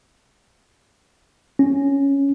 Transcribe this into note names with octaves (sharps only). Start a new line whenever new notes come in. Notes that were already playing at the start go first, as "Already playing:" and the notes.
C#4